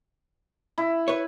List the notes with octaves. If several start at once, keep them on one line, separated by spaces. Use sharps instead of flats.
E4
B4 C#5